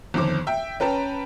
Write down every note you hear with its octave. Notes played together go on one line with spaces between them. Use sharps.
G1 F2 D#3 C5 D6
E5 G5
C#4 B4 G5 A5 A#5